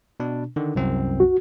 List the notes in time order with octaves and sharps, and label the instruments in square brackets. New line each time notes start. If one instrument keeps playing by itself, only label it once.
[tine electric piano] B2 D4
D3 D#3
C2 F#2 C4
[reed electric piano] F#4